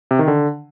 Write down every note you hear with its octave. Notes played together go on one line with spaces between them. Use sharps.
C3
D#3
D3